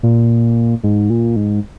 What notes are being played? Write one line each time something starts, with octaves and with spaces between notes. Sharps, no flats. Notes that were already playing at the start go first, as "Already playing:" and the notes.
A#2
G#2
A#2
G#2